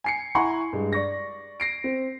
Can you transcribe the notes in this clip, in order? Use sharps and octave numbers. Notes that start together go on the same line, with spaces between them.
G#5 C7 C#7
E4 F#5 G#5 A#5 C6 C#6
G2 G#3
D5 C#6 A#6
A#6 C7 D7
C4